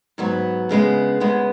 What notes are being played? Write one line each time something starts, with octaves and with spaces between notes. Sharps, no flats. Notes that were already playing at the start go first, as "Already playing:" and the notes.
G#2 F#3 B3 F#4
D2 C#3 G#3 B3
D2 C#3 G#3 B3